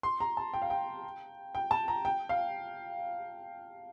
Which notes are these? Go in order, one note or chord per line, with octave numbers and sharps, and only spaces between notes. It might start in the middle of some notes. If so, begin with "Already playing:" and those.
C6
A#5
A5
G5
F5
G5
G5
A5
A#5
G5
F5